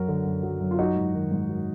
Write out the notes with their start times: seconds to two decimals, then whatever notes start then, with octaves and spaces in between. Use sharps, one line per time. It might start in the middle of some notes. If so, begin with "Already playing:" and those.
Already playing: F#2 F#3 F#4 A#4
0.08 D3
0.26 F#2
0.43 F#3
0.61 F#2
0.71 F4
0.79 F#3 D#4 F#4
0.96 G#2
1.14 D#3
1.31 G#2
1.49 F#3